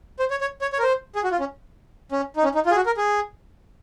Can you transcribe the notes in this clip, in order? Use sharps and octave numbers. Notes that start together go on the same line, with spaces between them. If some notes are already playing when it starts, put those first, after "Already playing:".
C5
C#5
C#5
C#5
C#5
A#4
C5
G#4
F#4
F4
C#4
C#4
D#4
C#4
D#4
F4
G#4
F#4
A#4
G#4